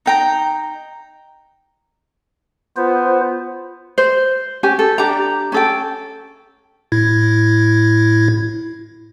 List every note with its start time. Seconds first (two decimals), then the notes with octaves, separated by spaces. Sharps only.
0.06 D#4 G5 A#5
2.77 B3 F4 C5
3.98 C5
4.63 C#4 G4 G#5
4.79 A4
4.98 D4 G4 A#5
5.52 C#4 A4 G5
6.92 A2 E4 G#6